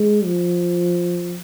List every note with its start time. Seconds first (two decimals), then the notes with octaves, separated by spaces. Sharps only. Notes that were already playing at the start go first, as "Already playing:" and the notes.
Already playing: G#3
0.25 F3